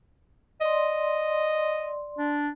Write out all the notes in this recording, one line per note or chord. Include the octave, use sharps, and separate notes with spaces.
D5 D#5 C6
D4